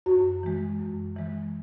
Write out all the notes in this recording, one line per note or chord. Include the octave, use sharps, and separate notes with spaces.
F#2 F#4
E3 G#3
F#2
E3 G#3